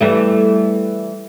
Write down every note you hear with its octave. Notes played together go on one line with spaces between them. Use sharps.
E3 G3 A3